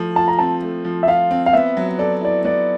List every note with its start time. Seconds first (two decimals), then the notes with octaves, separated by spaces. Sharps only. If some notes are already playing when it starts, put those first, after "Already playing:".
Already playing: F3 A3
0.16 F4 A5
0.28 A#5
0.39 C4 A5
0.62 A3
0.85 F3
1.03 E5
1.08 F4 F5
1.31 C4
1.46 F5
1.53 B3 E5
1.77 F#3
1.99 A4 D5
2.21 E4 D5
2.44 B3 D5